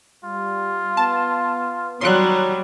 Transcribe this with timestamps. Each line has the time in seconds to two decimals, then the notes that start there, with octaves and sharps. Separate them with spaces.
0.24 G3 F4
0.97 B3 A5
2.01 D#3 F#3 G3 C#5 C6 F#6